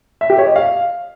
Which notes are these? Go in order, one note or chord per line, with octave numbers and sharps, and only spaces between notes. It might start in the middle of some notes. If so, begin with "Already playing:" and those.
E5
G4
C#5
D#5
F5